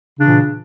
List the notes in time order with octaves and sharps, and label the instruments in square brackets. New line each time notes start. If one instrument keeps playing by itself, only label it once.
[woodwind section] C#3
D4
E3
A#2